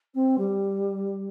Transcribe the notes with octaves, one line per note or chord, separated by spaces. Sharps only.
C4
G3